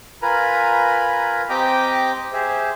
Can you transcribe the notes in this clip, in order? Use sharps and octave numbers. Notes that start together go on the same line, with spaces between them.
F4 A#4 B4 G#5 A#5 B5
C4 G4 D#5 G5 A#5 D6
G4 G#4 C5 E5